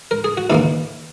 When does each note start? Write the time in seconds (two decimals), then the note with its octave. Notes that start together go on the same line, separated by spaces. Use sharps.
0.11 A#4
0.24 G#4
0.37 F#4
0.50 D#2 C#3 E3 A#3 C#4 E4